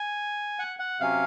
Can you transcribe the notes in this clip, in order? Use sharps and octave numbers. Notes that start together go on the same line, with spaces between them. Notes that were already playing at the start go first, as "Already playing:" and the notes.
Already playing: G#5
F#5
F#5
C3 F#3 C#4 F5